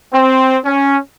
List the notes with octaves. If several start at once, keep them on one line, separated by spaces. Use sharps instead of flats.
C4
C#4